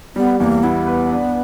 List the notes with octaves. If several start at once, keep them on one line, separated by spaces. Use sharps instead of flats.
G3 B3
E2 A#3 B3
B3 E4
B4
D4